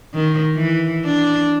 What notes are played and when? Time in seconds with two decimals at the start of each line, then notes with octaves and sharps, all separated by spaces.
0.14 D#3
0.55 E3
1.05 D4